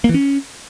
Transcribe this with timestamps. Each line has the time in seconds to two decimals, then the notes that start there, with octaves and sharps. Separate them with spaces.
0.04 A#3
0.09 E3
0.14 C#4